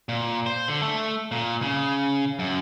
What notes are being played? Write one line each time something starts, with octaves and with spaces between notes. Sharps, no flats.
A#2
C5
D3
A3
A#2
C#3
F#2